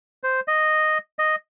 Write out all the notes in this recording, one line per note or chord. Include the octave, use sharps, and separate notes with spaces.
C5
D#5
D#5